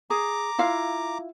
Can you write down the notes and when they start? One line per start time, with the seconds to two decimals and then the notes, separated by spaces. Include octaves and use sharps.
0.10 G#4 A#5 D6
0.59 E4 F4 F5